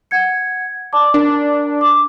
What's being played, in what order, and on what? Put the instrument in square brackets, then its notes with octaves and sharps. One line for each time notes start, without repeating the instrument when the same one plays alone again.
[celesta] F#5 G#6 C#7
D5 A5 D6
[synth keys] D4 [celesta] A#4
[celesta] D6